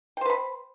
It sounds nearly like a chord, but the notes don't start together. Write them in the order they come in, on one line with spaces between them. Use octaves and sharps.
G5 C5 B4 B5